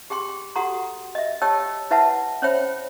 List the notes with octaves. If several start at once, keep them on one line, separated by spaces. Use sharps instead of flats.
G4 G#4 G5 C6
F#4 G4 A4 F#5 A#5 C6
D#5 E5
G4 C#5 D#5 G5 A5 E6
E4 B4 E5 F#5 A5
C#4 C5 C#5 E5 G5 B5